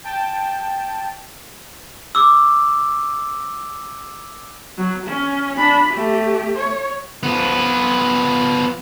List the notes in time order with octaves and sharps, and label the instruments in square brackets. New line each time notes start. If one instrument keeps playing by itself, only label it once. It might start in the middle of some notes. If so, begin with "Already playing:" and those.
[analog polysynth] G5 A5
[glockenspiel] D6 E6
[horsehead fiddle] F#3
C#4
D4 B5
A3 G4
C#5
[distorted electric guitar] F3 B3